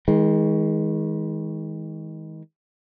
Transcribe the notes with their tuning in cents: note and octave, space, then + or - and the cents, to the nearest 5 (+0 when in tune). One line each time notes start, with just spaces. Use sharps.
D#3 +45 G#3 +0